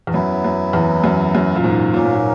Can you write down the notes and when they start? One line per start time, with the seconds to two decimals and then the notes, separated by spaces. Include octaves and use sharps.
0.07 E2
0.13 F#2 F#3 B3 E4
0.44 F#2
0.73 E2
1.04 F#2
1.35 F#2
1.55 A#2
1.64 G#2
1.94 A#2 F#3 A#3 C#4
2.04 G#2
2.14 A#2